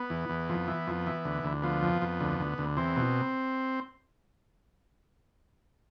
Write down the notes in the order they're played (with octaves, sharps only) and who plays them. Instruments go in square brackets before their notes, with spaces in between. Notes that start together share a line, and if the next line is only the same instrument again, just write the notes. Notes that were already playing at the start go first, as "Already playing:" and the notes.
Already playing: [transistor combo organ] B3
E2
E2
F2
E3
F2
E3
D2
D2
F3 B3
F2
F2
D2
D2
D2
E2 C4
B2